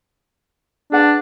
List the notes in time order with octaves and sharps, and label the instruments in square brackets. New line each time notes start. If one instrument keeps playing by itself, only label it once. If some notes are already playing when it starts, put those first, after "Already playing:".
[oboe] D4 [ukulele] G#4 B4 F#5